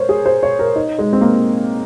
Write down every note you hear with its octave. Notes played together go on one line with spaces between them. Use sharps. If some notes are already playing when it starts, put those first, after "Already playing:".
Already playing: A#4 C5 C#5
G#4
C5
C#5
A#4
D#4
G#3
C4
A#3